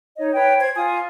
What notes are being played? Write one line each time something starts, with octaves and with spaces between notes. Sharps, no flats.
D#4 C#5 D#5
B4 C#5 G5
C5 G#6
F4 G#5 D#6